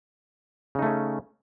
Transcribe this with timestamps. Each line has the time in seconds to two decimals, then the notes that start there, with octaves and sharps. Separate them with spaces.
0.75 C#3
0.79 D#4
0.82 A3
0.86 C#4